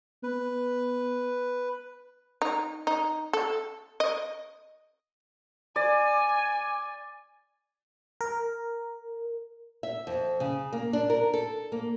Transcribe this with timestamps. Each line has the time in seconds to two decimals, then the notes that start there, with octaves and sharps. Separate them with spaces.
0.23 B3 B4
2.42 D#4
2.87 D#4
3.33 A4
4.00 D#5
5.76 D5 G#5
8.21 A#4
9.83 E5
10.07 F2
10.40 C#3
10.73 A#3
10.93 D4
11.10 A#4
11.34 A4
11.72 A#3